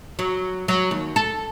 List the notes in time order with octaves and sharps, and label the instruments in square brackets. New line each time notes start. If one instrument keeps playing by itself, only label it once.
[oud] F#3
F#3
D#2
A4